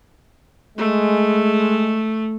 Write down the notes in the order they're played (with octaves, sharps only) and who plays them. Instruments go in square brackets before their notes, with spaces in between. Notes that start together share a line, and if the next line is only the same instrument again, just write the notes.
[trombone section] G#3 [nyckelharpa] A3